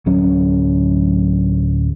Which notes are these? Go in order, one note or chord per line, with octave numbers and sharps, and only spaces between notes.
D1 F#3 C#4